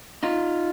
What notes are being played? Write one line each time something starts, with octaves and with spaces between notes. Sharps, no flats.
D#4 F4